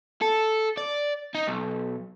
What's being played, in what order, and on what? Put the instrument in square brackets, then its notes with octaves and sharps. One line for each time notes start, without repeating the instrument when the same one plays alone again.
[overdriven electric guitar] A4
D5
D#4
B1